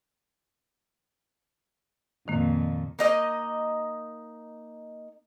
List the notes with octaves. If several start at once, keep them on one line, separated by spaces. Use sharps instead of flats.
F2 A#2 D#3 A#3
A#3 D#4 D#5